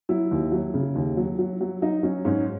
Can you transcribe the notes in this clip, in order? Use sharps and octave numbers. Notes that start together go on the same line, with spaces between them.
F#3 E4
D#2
F#3
C#3
D#2
F#3
F#3
F#3
F#3 D#4
F#3 C#4
G#2 C#4